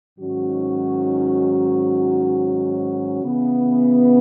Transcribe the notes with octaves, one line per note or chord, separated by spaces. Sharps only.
G#2 D#3 F#3 C#4 F#4
C#3 E3 B3